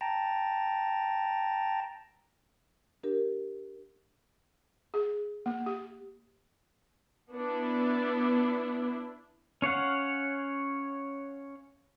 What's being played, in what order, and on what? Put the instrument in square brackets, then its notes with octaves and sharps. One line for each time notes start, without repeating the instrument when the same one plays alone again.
[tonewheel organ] G5 A5 A#5
[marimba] D4 G4 A#4
[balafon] G#4
A#3
G4
[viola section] B3 D4 E4
[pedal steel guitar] C#4 C#5 F5 F#5